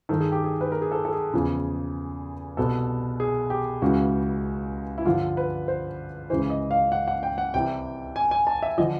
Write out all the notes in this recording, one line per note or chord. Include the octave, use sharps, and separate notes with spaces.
G2 D#3 A4
G#4
G4
G#4
B4
A#4
G#4
A4
A4
G#4
E2 C#3 F3
C2 B2 A4
G#4
G4
C#2 C#3 E3 F#4
E4
G2 D3 F3 F4
B4
C5
C#2 C#3 E3 C5
D#5
F5
F#5
F#5
G5
F#5
C2 C3 E3 G5
G#5
G#5
A5
E5
D3 F3 D#5